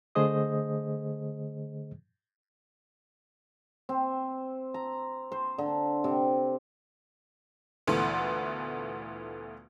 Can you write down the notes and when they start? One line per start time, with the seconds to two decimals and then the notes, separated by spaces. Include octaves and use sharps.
0.15 D3 A3 G#4 C5 D#5 D#6
3.89 C4
4.74 A#5
5.32 C5
5.58 D3
6.04 C3
7.87 D2 A#2 E3 A3 B3